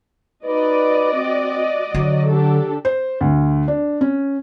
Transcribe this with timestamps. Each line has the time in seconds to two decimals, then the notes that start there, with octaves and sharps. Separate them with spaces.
0.45 D#4 F#4 B4 D5 D#5
1.13 C4
1.94 D3 F#3
2.29 D4 G4 A4
2.85 C5
3.21 D2
3.68 D4
4.01 C#4